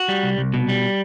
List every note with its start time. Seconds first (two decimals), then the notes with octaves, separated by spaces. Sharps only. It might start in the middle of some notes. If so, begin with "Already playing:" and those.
Already playing: F#4
0.08 G3
0.23 C2
0.38 C2
0.54 B2
0.69 G3